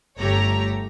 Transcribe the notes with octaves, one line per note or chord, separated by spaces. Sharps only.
G1 A3 G4 C#5 A#5